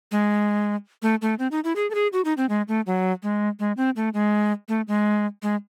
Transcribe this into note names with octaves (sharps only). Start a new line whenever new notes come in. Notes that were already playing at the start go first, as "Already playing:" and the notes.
G#3
A3
A3
C4
D#4
E4
G#4
A4
G#4
F#4
D#4
C4
G#3
A3
F#3
G#3
G#3
C4
A3
G#3
A3
G#3
G#3